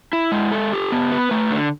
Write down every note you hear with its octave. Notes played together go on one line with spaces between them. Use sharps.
E4
G#3
A4
G4
B3
B4
A3
D3